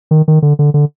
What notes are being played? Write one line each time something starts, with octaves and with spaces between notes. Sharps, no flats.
D#3
D#3
D3
D3
D3